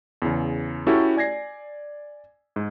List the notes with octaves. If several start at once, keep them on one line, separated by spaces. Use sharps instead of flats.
E2 C#3
A3 C#4 E4 F#4 G4 A4
D5 G#5 G#6 A#6 C7
G#2